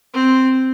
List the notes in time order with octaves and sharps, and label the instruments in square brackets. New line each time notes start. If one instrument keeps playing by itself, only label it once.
[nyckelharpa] C4